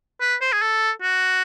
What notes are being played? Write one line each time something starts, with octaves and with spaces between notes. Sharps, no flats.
B4
C5
G#4
A4
F#4